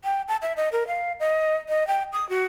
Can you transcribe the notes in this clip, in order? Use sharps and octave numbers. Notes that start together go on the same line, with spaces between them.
G5
A5
E5
D#5
A#4
F5
D#5
D#5
G5
D#6
F#4